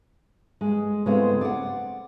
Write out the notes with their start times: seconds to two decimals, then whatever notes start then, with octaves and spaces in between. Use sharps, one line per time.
0.61 G#3
1.06 C#3 G#3 A3 B3 C4 E4
1.41 D5 F#5